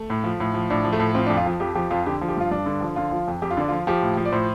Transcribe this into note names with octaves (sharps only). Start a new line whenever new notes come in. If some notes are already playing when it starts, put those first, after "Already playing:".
Already playing: A3
A2
F3
A2
F3
A2 D4
F3
A3
A2
F3 C4
D4
F2
F4
F3
F2 G4
F3 G4
F2 F4
D3 G4
F3
G4
G2 F4
G2 D4
D3
F3
D3 F4
F3
F2
F2 G4
F4
D3 D4
F3 F4
F3 G4
A2
F3
D5
A2 C5